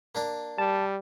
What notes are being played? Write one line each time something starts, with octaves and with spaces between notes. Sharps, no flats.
A#3 D4 A#4
G3 A5